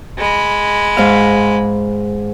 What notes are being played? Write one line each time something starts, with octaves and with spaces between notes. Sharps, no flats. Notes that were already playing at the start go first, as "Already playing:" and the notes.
G#3 B5
G#2 F5